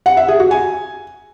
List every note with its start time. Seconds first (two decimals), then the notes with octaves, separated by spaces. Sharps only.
0.06 F#5
0.17 E5
0.28 G#4
0.40 F#4
0.51 G#5